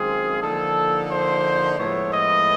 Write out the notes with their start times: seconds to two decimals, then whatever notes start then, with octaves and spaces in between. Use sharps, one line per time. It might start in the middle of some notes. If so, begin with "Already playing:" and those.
Already playing: F#2 D#3 G#3 C4 F4 G#4
0.42 D3 F3 A#3 D#4 A4
1.10 C5
1.77 A2 F3 G#3 B3 E4 C#5
2.12 D#5